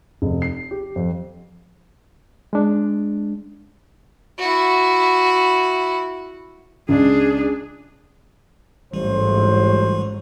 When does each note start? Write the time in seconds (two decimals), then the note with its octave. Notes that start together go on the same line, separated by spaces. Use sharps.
0.22 F1
0.42 C7
0.71 G4
0.96 F2
2.53 G#3 D4
4.39 E4 F#4
6.89 C#2 D4 G#4
8.93 A1 G#2 E3 F#3 G3 C5